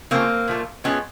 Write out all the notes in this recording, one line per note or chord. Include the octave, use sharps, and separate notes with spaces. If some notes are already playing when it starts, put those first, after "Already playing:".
C#3 F3 A3 A#3 C4
A#2 F3 A3
A2 F3 G#3 B3 C#4